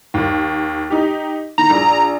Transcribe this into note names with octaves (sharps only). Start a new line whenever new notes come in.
D#2
D#4 G4
D#3 A#5
A#1